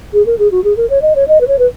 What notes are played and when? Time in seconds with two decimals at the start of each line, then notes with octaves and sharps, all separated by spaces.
0.13 G#4
0.26 A#4
0.39 G#4
0.52 F#4
0.64 G#4
0.77 A#4
0.90 C#5
1.02 D#5
1.16 C#5
1.28 D#5
1.41 B4
1.48 C#5
1.59 B4